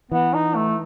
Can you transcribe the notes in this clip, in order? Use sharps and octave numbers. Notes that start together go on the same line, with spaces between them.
E3 B3
D#4
A3